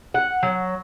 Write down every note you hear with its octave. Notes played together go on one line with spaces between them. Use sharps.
F#5
F#3